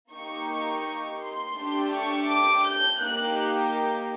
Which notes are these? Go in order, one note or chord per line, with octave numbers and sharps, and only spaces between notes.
A#3 D#4 G4 C#6
C6
A3 D4 G4
C#6
D6
G6
A#3 D#4 G4 F#6